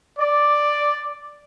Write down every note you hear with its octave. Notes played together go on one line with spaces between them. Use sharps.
D5